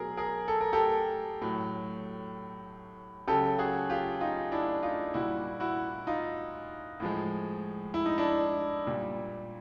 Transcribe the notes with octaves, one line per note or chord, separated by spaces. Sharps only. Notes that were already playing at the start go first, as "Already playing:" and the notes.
Already playing: B2 F#3 G#4 A#4
G#4 A#4
A4
A#4
G4 A4
A2 F#3
C#3 F#3 G4 A4
F#4 G#4
F4 G4
D#4 F4
D4 E4
D#4 F4
A#2 G3 E4 F#4
E4 F#4
D#4 F4
A2 F3 G#3
E4
D#4
D4 E4
A#2 G3